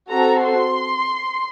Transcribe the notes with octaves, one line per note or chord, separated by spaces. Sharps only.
C4 F#4 A4 A#5
C6